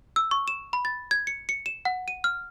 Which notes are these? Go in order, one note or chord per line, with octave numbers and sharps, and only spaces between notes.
E6
C#6
E7
B5
A6
G#6
C#7
C#7
E7
F#5
D#7
F6